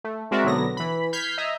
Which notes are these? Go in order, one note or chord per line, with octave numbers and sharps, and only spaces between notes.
A3
G#3 C4 F#4 A#4 D5 E5
B1 D3 F#3 B3 A#6
E3 B5
F6 G6 G#6 B6 C7
D#5 E5 A#5